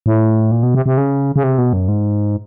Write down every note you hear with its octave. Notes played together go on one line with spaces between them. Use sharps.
A2
A#2
B2
C3
C3
C#3
C#3
C3
B2
F#2
G#2